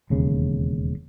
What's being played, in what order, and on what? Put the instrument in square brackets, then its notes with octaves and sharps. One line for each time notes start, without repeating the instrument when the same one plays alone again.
[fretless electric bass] E1 D#2 C#3